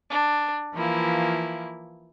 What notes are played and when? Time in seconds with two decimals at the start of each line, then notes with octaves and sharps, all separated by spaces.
0.10 D4
0.74 E3 F3 A#3 E4